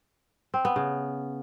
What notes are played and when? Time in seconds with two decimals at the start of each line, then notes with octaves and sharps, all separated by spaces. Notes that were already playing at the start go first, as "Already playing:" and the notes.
0.54 C4
0.65 B3
0.76 C#3